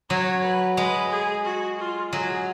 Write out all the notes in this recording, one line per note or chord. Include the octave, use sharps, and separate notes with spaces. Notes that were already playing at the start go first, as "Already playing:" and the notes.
F#3 C#5
B4
G#3 B4
G#4
F#4
F4
F#3 G#4